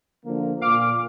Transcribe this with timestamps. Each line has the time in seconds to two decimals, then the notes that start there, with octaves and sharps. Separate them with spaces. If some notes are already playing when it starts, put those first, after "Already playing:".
0.25 D3 F3 A#3
0.61 A#2 F5 D6 F6